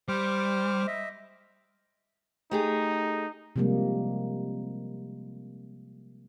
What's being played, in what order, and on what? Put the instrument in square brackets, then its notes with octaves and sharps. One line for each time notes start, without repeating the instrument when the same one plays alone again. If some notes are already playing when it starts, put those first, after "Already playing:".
[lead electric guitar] G3 [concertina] C5 D6 F6
[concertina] D#5 E5
[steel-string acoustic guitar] A3 G4 G#4 [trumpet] D#4
[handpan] C3 F3 G3 G#3 A#3